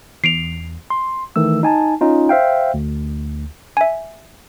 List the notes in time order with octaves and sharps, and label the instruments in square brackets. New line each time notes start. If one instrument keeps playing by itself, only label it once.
[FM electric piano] E2 [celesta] C7 D7 F7
[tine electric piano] C6
D#3 E3 A3 E6
D#4 G#5 A5
C#4 D#4 F4
C5 E5 F5 G5
D2
[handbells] E5 G#5